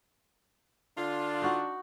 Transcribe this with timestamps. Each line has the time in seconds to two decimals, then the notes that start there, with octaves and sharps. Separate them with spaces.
0.98 D3 D4 F4
1.42 D#4 F#4 F#5